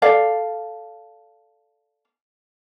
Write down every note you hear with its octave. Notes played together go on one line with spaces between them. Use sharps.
A4 D5 F5